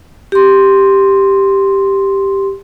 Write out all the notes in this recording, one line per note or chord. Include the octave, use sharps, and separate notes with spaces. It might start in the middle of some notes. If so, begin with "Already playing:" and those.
G4 C6